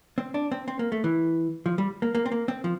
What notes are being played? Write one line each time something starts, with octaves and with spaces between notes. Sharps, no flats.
C4
D4
C4
C4
A#3
A3
E3
F3
G3
A#3
A#3
C4
A#3
C4
F3